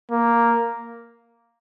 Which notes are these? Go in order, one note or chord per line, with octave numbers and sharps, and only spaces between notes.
A#3